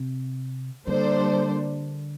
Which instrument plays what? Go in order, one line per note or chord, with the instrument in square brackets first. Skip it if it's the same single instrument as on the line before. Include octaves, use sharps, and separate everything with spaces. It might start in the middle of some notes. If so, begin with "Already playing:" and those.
Already playing: [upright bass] C3
[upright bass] D3 [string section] G3 A#3 D4 A4 C5